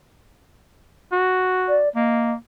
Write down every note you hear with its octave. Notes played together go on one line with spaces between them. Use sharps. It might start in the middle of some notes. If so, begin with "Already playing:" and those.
F#4
D5
A#3 D#5